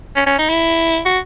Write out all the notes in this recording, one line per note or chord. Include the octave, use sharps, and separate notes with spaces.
C#4
C#4
D#4
E4
F#4